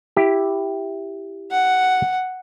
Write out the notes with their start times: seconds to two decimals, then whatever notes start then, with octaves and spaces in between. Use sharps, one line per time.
0.17 E4 G4
1.51 F#5